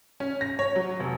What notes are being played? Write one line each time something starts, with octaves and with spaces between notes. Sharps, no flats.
C#4
A#6
C#5
F#3
F1